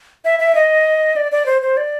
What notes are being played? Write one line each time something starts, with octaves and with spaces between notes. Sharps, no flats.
E5
E5
D#5
D5
D5
C5
C5
D5